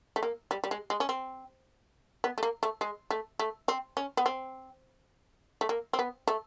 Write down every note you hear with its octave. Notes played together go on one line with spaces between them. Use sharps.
A3
A#3
G3
G3
G#3
G#3
C#4
C4
B3
A3
A#3
A3
G#3
A3
A3
C4
C#4
B3
C4
A3
A#3
C4
B3
A3